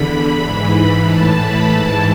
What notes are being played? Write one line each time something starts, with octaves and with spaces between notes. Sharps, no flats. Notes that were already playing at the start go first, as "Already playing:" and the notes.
Already playing: E2 D3 B5
G#2 E3
A2 E3 A5
B5
G#2 E3 A5